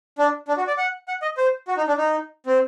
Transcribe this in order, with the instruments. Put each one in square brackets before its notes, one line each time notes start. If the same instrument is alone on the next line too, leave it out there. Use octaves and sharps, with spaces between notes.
[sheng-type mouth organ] D4
D4
F#4
D5
F#5
F#5
D#5
C5
F#4
D#4
D4
D#4
C4